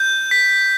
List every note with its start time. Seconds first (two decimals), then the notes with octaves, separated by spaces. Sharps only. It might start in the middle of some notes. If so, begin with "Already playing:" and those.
Already playing: G6
0.31 B6